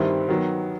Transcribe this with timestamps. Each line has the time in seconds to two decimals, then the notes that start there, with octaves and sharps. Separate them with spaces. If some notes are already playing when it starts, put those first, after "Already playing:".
Already playing: G2 D#3 G3 C4 E4
0.29 D#3 F#3 B3